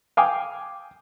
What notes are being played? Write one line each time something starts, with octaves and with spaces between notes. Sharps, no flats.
F5 G5 G#5 D6 D#6 F6